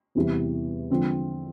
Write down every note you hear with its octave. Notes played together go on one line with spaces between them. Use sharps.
E2 C3 E3 G3
D3 F3 G#3 C4 F4